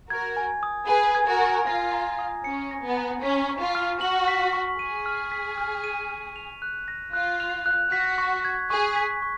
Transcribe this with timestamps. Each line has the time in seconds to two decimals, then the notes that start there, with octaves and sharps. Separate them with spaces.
0.10 F#4 A#4 G#6
0.37 G#5
0.63 D#6
0.89 G#4 B4 G#5
1.15 G#6
1.28 F#4 A#4
1.41 G#5
1.67 F4 A#6
1.93 A#5
2.19 D#6
2.44 C#4 C#7
2.71 A#6
2.84 B3
2.97 A#5
3.23 C#4 B6
3.49 C#6
3.62 F4
3.75 F6
4.01 F#4 F#7
4.28 B6
4.53 C#6
4.79 G#4 D#7
5.06 F6
5.32 B6
5.58 F6
5.84 D#7
6.09 F6
6.36 F7
6.62 F#6
6.88 A#6
7.13 F4 F#6
7.40 F7
7.66 F#6
7.92 F#4 B6
8.18 C#6
8.45 G#6
8.70 G#4 C#6
8.96 B6
9.22 C#6